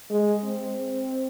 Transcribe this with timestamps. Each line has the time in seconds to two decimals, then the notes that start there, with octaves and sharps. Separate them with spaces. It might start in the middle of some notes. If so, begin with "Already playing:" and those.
0.10 G#3
0.44 C4